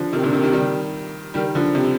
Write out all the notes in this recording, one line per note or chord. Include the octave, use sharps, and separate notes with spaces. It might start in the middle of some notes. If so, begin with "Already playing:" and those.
Already playing: D3 F3
C3 D#3
A#2 D3
C3 D#3
C3 D#3
D#3 G3
D#3 G3
D3 F3
C3